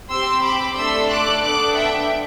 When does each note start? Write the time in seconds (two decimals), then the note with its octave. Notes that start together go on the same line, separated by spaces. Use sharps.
0.10 C4 G4 C6 E6
0.44 B5 D6
0.76 A3 D4 A4 C6 E6
1.10 D6 F#6
1.43 B3 D4 A4 D6 F#6
1.76 E5 G5